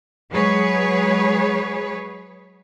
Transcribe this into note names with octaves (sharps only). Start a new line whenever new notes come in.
F#3 G#3 G#4 B4 C#5